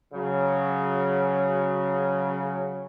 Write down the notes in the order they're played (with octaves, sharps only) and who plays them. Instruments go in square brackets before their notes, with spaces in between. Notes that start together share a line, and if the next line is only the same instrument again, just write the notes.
[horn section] C#3 F#3